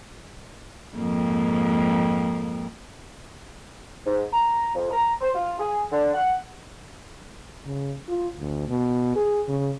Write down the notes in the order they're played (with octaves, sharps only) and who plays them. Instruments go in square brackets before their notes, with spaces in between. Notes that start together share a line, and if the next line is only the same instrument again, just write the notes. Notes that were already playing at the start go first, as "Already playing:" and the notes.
[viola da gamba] F2 G#2 A#3
[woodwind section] G#2
A#5
F2
A#5
C5
F4
G#4
D3
F#5
[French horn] C#3
F4
D2
B2
G#4
C#3